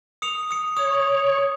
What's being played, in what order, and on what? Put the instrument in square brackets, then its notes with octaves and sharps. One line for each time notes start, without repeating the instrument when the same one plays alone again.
[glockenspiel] D#6 C#7 F7
D#6 C#7
[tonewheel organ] C#5 [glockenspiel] D#6